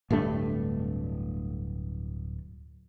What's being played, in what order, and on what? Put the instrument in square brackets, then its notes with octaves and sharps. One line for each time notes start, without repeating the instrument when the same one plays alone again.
[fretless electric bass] D1 G2 A3 D4